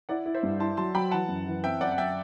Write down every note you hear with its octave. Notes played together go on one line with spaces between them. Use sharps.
E4 D5 F#5
E4
C5 E5
G2
E4 A5 C6
F#3 A5 C6
F#3 G5 B5
E3 F#5 A5
F#2
E3
C4 E5 G5
F#2 D5 F#5
F#5
F#2 E5 G5